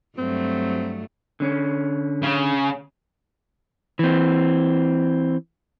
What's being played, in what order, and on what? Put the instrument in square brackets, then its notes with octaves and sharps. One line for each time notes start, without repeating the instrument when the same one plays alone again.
[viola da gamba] G2 F#3 A3 [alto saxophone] C4
[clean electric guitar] D3 C#4
[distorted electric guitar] C#3
[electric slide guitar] E3 C4